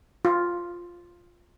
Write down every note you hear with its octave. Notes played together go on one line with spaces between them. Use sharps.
F4